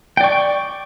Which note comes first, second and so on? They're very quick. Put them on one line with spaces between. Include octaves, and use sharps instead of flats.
G5 D5 C#6